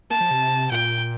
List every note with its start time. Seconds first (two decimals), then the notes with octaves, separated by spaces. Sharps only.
0.10 A#3 A5
0.21 F3
0.31 C3
0.71 A#2 G5